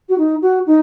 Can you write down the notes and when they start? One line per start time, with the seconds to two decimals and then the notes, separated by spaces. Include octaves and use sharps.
0.09 F#4
0.18 D#4
0.42 F#4
0.67 D#4